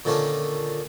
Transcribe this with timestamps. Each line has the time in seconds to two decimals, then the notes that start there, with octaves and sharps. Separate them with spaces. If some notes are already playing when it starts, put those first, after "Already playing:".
0.05 A#2 D3 D#3 C#4 D4 F4